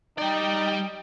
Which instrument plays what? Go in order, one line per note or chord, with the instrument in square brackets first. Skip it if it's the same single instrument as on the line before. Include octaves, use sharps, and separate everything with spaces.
[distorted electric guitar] G3 D5 [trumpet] D#4 [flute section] G5